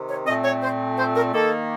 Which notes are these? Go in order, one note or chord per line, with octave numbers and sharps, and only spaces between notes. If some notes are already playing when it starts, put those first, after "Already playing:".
Already playing: C3 D#3
C#5
A#2 A3 C4 D#5
C#5
C5
C5
A#4
D#3 A#3 A4